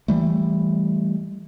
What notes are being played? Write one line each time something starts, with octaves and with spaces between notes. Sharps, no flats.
E3 G3 A3